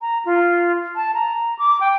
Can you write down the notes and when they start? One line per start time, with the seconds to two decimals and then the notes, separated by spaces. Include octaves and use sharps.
0.01 A#5
0.25 F4
0.95 A5
1.14 A#5
1.59 D6
1.80 G5